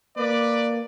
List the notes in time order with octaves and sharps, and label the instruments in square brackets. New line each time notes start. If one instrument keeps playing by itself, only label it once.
[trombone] A#3 [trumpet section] B4 D5